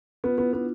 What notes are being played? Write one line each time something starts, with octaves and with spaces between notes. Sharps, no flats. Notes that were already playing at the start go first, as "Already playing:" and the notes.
B3 F4
B3 E4
B3 D4